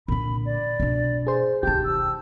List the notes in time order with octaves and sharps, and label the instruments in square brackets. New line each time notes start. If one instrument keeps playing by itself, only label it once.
[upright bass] A#2 D3 [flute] B5
[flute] D5
[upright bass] B2 D4
[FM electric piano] G#4 C5
[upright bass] E1 D#2 [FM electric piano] G4 G5 A5 [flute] G6
[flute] E6